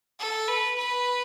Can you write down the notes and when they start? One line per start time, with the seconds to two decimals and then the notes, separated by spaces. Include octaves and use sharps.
0.19 A4
0.48 B4
0.78 B4